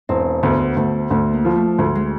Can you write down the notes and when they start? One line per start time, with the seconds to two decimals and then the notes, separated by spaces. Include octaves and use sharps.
0.09 E1 C4
0.43 D2 B3
0.77 D2 A3
1.11 D2 A3
1.33 A#3
1.45 F3
1.56 A3
1.78 D2 G#3
1.95 G#3